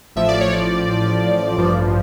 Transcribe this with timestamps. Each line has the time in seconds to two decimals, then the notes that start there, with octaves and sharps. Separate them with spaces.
0.16 A1 A2 F3 E5
0.28 D5
0.41 C#5
0.53 D5
1.56 A1 G2 F3